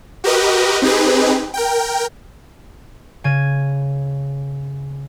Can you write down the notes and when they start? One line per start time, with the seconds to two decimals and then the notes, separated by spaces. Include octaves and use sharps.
0.24 F#4 G4 A#4 B4 D#5
0.82 C4 D#4 G4 G#4 B4
1.54 A#4 G5
3.24 C#3 G#6 D#7